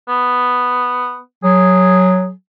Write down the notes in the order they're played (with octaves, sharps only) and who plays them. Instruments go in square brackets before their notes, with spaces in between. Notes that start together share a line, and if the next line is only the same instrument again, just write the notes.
[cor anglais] B3
[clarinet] F#3 [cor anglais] G#4